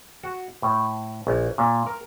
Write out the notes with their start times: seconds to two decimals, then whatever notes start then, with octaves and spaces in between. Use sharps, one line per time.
0.23 F#4
0.62 A2
1.27 A#1
1.58 A#2
1.86 A#4